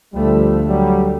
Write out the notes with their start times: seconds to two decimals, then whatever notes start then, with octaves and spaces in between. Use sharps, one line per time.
0.14 D2 F3 G3 A3
0.66 F#3 G3